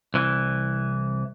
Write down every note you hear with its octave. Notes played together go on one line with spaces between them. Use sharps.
C2 E3